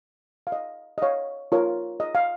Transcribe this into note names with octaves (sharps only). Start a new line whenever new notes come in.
F5
D#5
D#5
C#5 F5
F4 A#4 C#5
D#5
F5